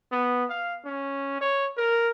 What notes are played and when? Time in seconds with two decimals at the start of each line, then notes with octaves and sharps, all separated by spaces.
0.12 B3
0.50 F5
0.85 C#4
1.41 C#5
1.77 A#4